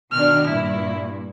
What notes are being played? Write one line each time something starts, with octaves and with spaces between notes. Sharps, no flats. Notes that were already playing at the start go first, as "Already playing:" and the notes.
B2 D#3 D4 F6
G2 A#2 E4